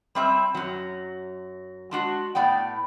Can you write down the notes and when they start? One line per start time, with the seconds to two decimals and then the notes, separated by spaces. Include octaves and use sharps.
0.15 G3 C4 E5
0.54 F#2 F#3
1.91 G#3 D4 F#4
2.35 A2 B3 D5 G5